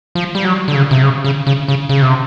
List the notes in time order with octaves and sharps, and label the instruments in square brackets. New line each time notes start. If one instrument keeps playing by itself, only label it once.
[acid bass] F3
G3
F#3
D3
C#3
C3
C#3
C#3
C#3
C#3
C#3
C3